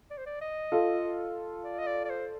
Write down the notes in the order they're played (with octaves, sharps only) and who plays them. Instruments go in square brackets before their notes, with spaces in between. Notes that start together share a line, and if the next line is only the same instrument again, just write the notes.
[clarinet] D5
C5
D5
D#5
[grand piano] F4 A4
[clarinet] D5
D#5
D5
D5
C5